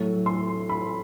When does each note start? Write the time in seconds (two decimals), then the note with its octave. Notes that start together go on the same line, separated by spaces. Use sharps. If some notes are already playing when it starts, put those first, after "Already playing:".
Already playing: A2 F#3 A3
0.26 C6
0.69 B5